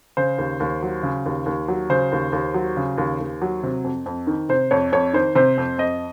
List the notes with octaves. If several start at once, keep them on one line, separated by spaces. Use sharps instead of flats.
C#3 C5
D#2
D#2
F#3
C#3
D#2
D#2
F#3
C#3 C5
D#2
D#2
F#3
C#3
D#2
D#2
F#3
C3
F2
F2
D#3
C3 C5
F2 C#5
F2 C#5
D#3 C5
C3 C5
F2
F2 D#5